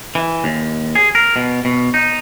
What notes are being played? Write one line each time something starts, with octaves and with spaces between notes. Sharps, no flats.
E3
D#2
G#4
A#4
B2
B2
D#4